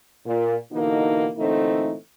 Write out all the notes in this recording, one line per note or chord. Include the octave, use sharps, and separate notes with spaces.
A#2
B2 D3 E3 A#3 D#4
A#2 D3 E3 A3 C4 D#4